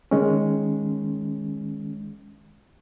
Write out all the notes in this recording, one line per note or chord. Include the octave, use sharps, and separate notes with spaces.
D#3 G#3 C#4